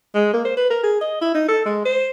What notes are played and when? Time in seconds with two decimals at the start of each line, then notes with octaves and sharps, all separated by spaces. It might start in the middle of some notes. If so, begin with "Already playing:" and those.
0.14 G#3
0.33 A#3
0.45 C5
0.57 B4
0.70 A#4
0.83 G#4
1.01 D#5
1.21 E4
1.35 D#4
1.48 A4
1.65 G#3
1.85 C5